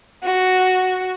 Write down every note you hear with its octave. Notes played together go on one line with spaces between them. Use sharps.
F#4